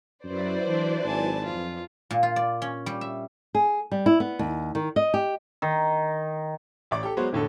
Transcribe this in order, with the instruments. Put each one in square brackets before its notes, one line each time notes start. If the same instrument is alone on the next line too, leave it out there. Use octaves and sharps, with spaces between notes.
[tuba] F#2 [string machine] F#3 E4 B4 [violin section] C5 D5
[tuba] E3 [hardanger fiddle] D4
[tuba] G#1 [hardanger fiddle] G#5 A5
[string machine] F2 [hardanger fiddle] F4
[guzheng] A#2
F4
D5
C#4
G3
E5
[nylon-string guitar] G#4
G3
E4
B3
D#2
D#3
D#5
G4
[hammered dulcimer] D#3
[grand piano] A1 D5 D6
G4 A4
F#3 G#3 B3 F#4 C5
E1 A2 D3 A4